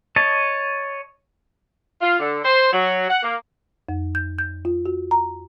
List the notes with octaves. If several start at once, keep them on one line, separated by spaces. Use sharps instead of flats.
C#5 D#5 A5
F4
D3
C5
F#3
F#5
A#3
F2
G6
G6
F4
F#4
A#5